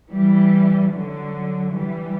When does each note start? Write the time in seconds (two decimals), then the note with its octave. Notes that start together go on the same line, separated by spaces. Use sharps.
0.12 E3 G3
0.91 D3 F#3
1.71 E3 G3